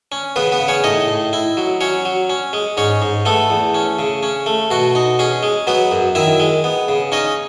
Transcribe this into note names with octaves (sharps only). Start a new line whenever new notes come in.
C#4
C#3 B3 B4
B3 B4
C#3
C#4 C#5
A2 D#4 D#5
A2
E4
F#3
F#3 C#4 C#5
F#3
C#4
G#3
G#2 C#4 C#5
G#2
A3 B3 A4
E2
C#4
C#3
C#4
A3
B2 F#4
D#4
C#4 G#4
G#3
F#3 B3 B4
F#2
D#3 E4 E5
G#3
B3
C#3
C#4 D#4 D#5